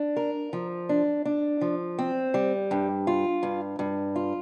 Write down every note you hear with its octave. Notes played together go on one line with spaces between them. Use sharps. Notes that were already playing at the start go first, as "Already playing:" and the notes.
Already playing: D4
A#4
F3
D4
D4
F3
C4
G3
G2
F4
G2
G2
F4